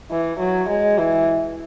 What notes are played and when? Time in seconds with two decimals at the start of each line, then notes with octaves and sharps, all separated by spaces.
0.11 E3
0.40 F#3
0.69 G#3
0.98 E3